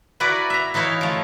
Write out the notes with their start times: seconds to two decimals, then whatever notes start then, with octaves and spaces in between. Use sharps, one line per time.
0.20 E4 F#4 A#4 B4 D5
0.50 E5 A#5
0.74 E3 D#4 E4 C#5 F5
1.01 F3 A3